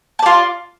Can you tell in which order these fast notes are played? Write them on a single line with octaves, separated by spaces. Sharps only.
A5 D5 F4